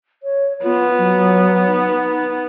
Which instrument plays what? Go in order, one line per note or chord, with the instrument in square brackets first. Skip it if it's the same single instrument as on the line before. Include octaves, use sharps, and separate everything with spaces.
[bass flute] C#5
[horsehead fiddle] B3 [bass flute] F4
[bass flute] F#3
D#4